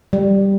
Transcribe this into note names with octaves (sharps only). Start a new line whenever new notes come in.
G3